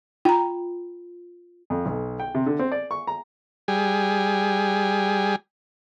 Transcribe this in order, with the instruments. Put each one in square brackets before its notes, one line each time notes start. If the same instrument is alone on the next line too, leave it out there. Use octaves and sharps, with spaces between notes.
[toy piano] F4 [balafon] G5 A#5
[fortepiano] F2
B1
G5
C3
D3
C4
D5
C#6
A#5
[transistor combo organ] G3 G#4